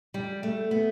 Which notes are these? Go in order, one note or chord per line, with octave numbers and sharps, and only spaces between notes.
G3
A3
B3